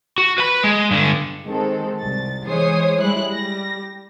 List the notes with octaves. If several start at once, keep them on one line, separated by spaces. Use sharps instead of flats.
F#4
B4 B5
G#3
G2 D3
D#3 G#3 C4 A4
C2 A6
E3 G#3 C5 C#5 D#6 C7
G3 G#3 E4 F#6
G3 A#6